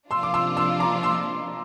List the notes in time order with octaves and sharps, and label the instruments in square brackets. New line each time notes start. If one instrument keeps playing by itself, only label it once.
[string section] C3 F3 A#3 D4 F4 [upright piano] C6 E6
[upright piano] D6
C6 E6
C6 E6
A#5 D6
C6 E6